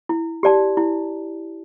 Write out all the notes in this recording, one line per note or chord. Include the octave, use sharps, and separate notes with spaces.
E4
G4 D5 A5
E4